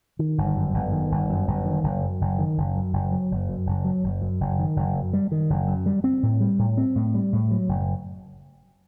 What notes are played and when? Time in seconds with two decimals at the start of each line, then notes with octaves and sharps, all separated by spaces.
0.19 D#3
0.38 G1
0.56 F#2
0.74 G1
0.92 D#3
1.11 G1
1.29 F#2
1.48 G1
1.65 D#3
1.84 F#1
2.02 F#2
2.21 F#1
2.38 D#3
2.57 F#1
2.76 F#2
2.93 F#1
3.12 F#3
3.31 F#1
3.49 F#2
3.66 F#1
3.85 F#3
4.03 F#1
4.21 F#2
4.40 F#1
4.59 D#3
4.76 F#1
4.94 F#2
5.13 G3
5.32 D#3
5.50 F#1
5.67 F#2
5.86 G3
6.04 C4
6.23 A2
6.40 G3
6.59 A2
6.77 C4
6.95 A2
7.14 G3
7.33 A2
7.51 F#3
7.68 F#1